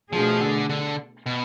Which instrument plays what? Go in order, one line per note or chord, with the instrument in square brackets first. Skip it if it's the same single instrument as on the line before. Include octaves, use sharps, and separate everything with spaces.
[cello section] B2 A3 D4 G#4 [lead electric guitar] F3
[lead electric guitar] D3
D3
B2